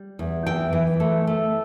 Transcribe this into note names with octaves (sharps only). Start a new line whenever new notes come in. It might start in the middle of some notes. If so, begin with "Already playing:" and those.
Already playing: G3
E2
E3 G5
E3
A3
A3